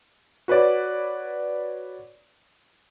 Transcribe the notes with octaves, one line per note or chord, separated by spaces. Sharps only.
F#4 B4 C#5 D5